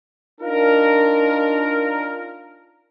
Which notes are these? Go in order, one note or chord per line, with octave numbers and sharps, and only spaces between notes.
D4 D#4 F4 A#4